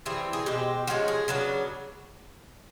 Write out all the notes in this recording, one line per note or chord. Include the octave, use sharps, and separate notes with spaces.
E3 G3 C4 G#4
G#4
B2 G#3 C4 G4
F3 G#3 C#4 F#4
G#4
C#3 F#3 B3 D4